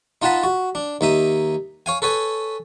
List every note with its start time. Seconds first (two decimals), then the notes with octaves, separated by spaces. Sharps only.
0.22 D#4 F4 D#5 F#5 A5 B5
0.43 F#4
0.75 D4
1.01 D#2 D#4 E5 D#6
1.86 C#5 F5 G#5
2.02 A4 B4 C#5 G#5